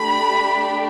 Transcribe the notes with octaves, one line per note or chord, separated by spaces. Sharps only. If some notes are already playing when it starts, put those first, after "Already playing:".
Already playing: A3 D4 G4 B5